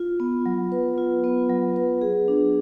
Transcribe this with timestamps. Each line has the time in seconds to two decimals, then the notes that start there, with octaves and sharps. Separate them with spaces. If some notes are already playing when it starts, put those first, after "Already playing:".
Already playing: F4
0.20 B3
0.46 F#3
0.72 B4
0.98 F4
1.24 B3
1.50 F#3
1.76 B4
2.01 G#4
2.28 D4